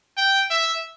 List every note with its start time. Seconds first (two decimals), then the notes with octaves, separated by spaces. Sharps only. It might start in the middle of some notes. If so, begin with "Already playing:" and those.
0.17 G5
0.50 E5